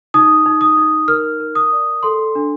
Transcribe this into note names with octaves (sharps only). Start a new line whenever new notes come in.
D#4 D#6
D#4
D#6
D#4
A#4 F6
A#4
D#6
D5
A4 C6
D4